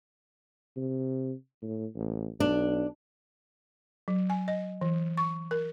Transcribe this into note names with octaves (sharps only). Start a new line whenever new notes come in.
C3
A2
A1
B1 D4
F#3
G#5
D#5
E3
C#6
A#4